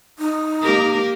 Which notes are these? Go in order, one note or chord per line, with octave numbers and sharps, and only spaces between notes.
D#4
A#3 G4 A#4